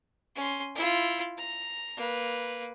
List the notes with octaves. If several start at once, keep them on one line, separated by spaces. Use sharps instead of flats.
C#4 C6
E4 F4
A#5
A#3 B4